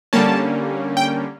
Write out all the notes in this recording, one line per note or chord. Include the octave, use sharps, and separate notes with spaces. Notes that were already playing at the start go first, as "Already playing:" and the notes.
D3 G3 A#3 C#4 A5
G5